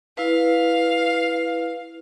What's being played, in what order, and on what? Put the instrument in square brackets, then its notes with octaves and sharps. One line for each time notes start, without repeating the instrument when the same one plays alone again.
[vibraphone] E4 B4 [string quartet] F5